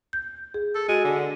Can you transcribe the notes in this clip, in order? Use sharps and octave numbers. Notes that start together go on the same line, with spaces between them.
G6
G#4
A4
G#3 F#4
D3